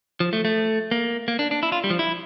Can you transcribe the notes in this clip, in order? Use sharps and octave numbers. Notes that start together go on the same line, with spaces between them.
F3
A3
A3
A#3
A#3
D4
D4
E4
F4
G3
F3
E4